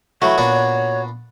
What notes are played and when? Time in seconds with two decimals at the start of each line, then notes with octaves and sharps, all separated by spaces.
0.22 E3 F#3 A3 F#4 C#5
0.38 A#2 B3 D4